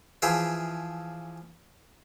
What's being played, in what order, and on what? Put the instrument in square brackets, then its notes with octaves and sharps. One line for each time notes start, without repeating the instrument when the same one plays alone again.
[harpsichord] E3 F3 G#4 E5 G5